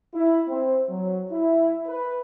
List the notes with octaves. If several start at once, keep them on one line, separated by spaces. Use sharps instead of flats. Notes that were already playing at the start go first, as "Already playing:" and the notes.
E4
C4
F#3
E4
B4